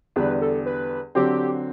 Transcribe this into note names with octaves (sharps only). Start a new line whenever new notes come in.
E2 D3 G3 B4
A4
B4
D3 F#3 C4 G4